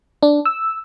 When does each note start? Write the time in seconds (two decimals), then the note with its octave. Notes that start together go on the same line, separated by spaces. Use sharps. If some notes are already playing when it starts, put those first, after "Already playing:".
0.23 D4
0.45 E6